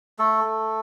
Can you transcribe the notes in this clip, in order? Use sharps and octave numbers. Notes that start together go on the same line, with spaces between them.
A3 A4
A3